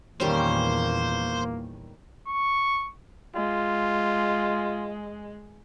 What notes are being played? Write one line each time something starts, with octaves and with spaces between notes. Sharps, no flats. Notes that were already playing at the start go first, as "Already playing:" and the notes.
E2 A#2 D#3 G3 A#3 C#4 C5
C#6
G#3 F4